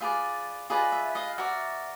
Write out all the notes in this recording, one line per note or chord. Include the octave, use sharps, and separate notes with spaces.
F4 G#4 B4 D5 E5
F4 G#4 B4 D5 D#5
E5
D#5 F5
F#4 A#4 D5 E5